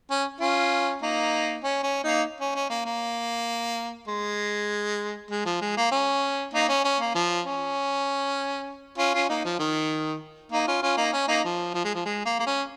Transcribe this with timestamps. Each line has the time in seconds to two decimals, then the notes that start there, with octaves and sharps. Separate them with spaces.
0.10 C#4
0.40 C#4 F4
1.02 A#3 D#4
1.64 C#4
1.83 C#4
2.04 A#3 D#4
2.40 C#4
2.55 C#4
2.70 A#3
2.85 A#3
4.08 G#3
5.31 G#3
5.46 F3
5.61 G#3
5.77 A#3
5.92 C#4
6.54 A#3 D#4
6.69 C#4
6.84 C#4
7.00 A#3
7.15 F3
7.46 C#4
8.98 C#4 F4
9.14 C#4 F4
9.29 A#3 D#4
9.45 F3
9.59 D#3
10.52 A#3 D#4
10.67 C#4 F4
10.82 C#4 F4
10.97 A#3 D#4
11.13 C#4
11.28 A#3 D#4
11.44 F3
11.74 F3
11.84 G#3
11.95 F3
12.05 G#3
12.25 A#3
12.39 A#3
12.47 C#4